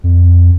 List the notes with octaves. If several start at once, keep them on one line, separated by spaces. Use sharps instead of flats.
F2